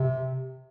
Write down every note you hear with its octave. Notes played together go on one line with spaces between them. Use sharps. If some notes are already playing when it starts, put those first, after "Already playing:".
Already playing: C3